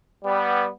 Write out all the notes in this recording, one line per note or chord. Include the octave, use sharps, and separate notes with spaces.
G3 B3